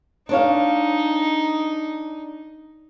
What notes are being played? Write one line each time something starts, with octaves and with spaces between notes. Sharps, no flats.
D4 D#4 C#5 F5